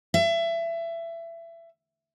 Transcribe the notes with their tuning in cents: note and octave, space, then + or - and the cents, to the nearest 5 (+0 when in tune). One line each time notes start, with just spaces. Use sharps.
E5 +25